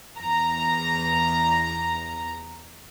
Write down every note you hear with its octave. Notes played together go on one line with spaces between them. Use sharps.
E2 A#5